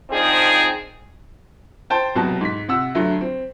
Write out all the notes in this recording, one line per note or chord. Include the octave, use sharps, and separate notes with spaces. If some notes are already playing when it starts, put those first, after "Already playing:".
D#3 F3 C4 D4 D#4 G#4
C5 G5 A5
E1 C2 B2 F#3 F#4 A5
G#2 B6
C3 F#5 E6
D2 G2 F#3 A3
C4